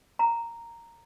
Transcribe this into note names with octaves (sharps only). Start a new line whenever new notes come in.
A#5